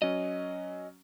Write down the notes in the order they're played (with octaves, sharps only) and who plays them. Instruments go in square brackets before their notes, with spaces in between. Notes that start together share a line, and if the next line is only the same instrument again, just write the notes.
[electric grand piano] F#3 C#4 [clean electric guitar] D#5